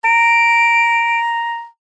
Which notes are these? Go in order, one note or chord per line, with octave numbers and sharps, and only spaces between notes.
A#5 D7